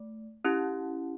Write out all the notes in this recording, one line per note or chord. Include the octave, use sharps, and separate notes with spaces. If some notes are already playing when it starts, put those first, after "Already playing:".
Already playing: A3
C#4 E4 G4